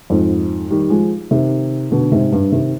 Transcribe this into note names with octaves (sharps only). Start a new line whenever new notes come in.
F2 G#2
D#3 G3
F3 G#3
C3 D#3
B2 D3
G#2 C3
G2
C3 D#3